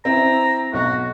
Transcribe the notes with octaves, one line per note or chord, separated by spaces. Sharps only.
C4 E4 A#5
B1 F#4